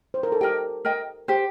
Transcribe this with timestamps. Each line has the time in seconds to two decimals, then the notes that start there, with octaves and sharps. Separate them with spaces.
0.14 C5
0.23 A#4
0.32 A4
0.41 G4 A#4 D#5 G5
0.85 A#4 D#5 G5
1.28 G4 C5 G5